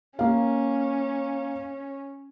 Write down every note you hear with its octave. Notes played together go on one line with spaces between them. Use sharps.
A#3 C#4 F5